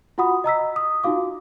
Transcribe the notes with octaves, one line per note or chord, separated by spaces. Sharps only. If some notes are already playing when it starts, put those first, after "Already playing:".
F4 F#4 F#5 B5 D#6
D#5 A#5 E6 B6
D#6
D#4 F4 F#4 F5 D6